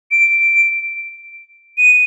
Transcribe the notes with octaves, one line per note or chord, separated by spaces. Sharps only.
D7
D#7